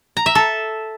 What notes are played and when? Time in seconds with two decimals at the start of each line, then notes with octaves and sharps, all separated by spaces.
0.17 A#5
0.26 E5
0.35 A4